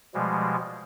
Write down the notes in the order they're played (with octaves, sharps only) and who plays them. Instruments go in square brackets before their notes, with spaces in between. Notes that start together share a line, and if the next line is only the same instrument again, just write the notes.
[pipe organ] B2 F3 G3 G#3